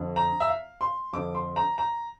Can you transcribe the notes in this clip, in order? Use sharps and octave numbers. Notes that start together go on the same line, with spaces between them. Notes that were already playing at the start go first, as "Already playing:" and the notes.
Already playing: F2 D3
A#5
E5
F5
C6
F2 D3 D6
C6
A#5
A#5